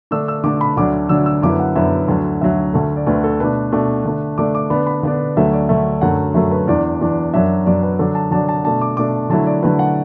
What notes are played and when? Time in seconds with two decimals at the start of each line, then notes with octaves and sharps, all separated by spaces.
0.11 D3 A3 D4 E6
0.28 E6
0.44 D3 A3 D4 D6
0.61 B5
0.77 D2 D3 F#3 D4 D6
1.09 D2 D3 F#3 D4 E6
1.26 E6
1.42 F#2 D3 B3 E4 D6
1.60 F#5
1.75 F#2 D3 B3 E4 E5
2.08 D2 D3 F#3
2.41 D2 D3 F#3 E5
2.73 D2 D3 A3
2.96 D5
3.06 D2 D3 A3 B4
3.24 A4
3.40 B2 A3 D4 B4
3.72 B2 A3 D4
4.05 D3 A3 D4
4.38 D3 A3 D4 D6
4.55 D6
4.70 D3 B3 D4 B5
4.87 B5
5.03 D3 B3 D4
5.37 D2 D3 F#3 A3 E5
5.53 D5
5.69 D2 D3 F#3 A3 E5
6.01 F#2 D3 F#3 A3 F#5
6.34 F#2 D3 F#3 A3 E5
6.51 B4
6.68 E2 E3 D4 D5
7.01 E2 E3 D4
7.33 F#2 F#3 D4 E5
7.66 F#2 F#3 D4 D5
7.83 B4
7.99 D3 F#3 D4 A4
8.15 A5
8.31 D3 F#3 D4 A5
8.49 A5
8.64 B2 A3 D4 A5
8.81 D6
8.97 B2 A3 D4 D6
9.30 D3 F#3 A3 E4 A5
9.47 D5
9.63 D3 F#3 A3 E4 B4
9.79 F#5